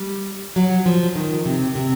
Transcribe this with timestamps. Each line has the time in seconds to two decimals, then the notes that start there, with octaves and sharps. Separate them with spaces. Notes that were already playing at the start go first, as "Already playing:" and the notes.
Already playing: G3
0.56 F#3
0.86 F3
1.16 D#3
1.45 C3
1.75 C3